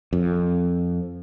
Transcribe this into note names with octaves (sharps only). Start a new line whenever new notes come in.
F2